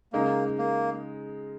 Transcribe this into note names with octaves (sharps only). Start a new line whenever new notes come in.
C#3 G#3 A#3 D#4
A#3